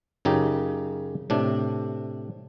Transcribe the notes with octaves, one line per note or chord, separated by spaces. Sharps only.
F#2 C#3 D#4 G4 G5
A2 C3 D4